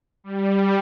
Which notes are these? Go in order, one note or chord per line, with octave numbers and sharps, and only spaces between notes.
G3